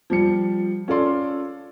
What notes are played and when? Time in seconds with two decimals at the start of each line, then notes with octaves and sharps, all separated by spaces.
0.10 F3 G3 C#7
0.88 C#4 F4 A4 D5 C6